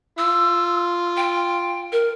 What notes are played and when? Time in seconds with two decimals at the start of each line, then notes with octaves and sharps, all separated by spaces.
0.18 F4 E6
1.17 G5
1.92 A#4